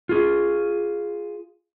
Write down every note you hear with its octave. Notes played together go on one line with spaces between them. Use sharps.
F4 G#4